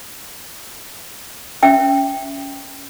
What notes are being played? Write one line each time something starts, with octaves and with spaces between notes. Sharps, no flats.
C#4 E5 G5